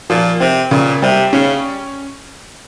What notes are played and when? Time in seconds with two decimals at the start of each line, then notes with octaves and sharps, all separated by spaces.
0.10 A#2 F3
0.40 C3 C4
0.71 A#2 C#3
1.02 C3 G3
1.33 C#3 C#4